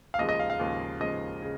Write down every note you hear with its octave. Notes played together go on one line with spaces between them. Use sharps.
F5
D#2 C#3 F3 G#3 D#5
D#5
F5
F5
D#2 C#3 F3 G#3
D#2 C#3 F3 G#3 D#5
C#3